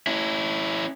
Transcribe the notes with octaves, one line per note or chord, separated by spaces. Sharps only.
C#4 E4